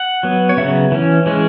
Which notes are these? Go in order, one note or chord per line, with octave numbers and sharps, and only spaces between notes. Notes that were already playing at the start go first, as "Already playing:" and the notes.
Already playing: F#5
F#3 B3
C#5
C#3 F#3 B3 E5
E3 C#4
E3 G#3 C#4